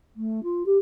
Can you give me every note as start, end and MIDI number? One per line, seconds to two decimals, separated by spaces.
0.16 0.40 57
0.44 0.63 65
0.66 0.78 67